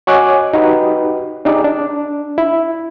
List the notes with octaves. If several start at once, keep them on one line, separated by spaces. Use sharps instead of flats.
F#4 C#5 D#5 G#5 D6 F#6
D#4 F#4 G4 B4
D4 D#4 G4 G#4 D5
D4
E4